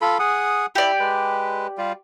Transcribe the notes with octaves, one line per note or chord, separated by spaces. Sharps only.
F4 A4 B5
G#4 F#5 D#6
E4 G4 D5
G#3 B4
G3 F4